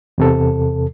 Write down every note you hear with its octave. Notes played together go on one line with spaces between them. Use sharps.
E2 C3 A4